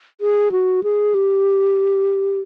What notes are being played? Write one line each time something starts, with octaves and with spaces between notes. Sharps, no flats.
G#4
F#4
G#4
G4